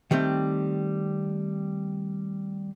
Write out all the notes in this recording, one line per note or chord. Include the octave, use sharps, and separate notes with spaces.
D#3 G3 A3 C4